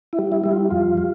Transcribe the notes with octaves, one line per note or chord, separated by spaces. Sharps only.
E4
G3
E4
G3 E4
F4
F2 F4
G3